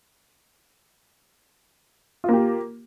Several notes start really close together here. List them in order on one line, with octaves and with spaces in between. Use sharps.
F4 A#3 G4